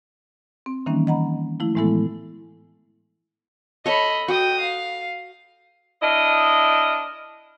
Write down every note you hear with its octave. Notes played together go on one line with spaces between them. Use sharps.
C4
D#3 E3 G3 A#3 C#4 D#4
D#5 F#5 A#5 B5
F3 A3 E4
A2 E3 G#3 B3 E4 A4
A4 C#5 D#5 B5
F#4 G5 D#6
F5
D4 E4 A#4 D#5